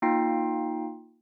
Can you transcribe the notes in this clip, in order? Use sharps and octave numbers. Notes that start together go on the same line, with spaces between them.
A#3 D#4 F4 G5 C7